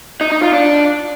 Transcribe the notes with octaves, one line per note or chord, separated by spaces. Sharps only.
D#4
D#4
F4
D4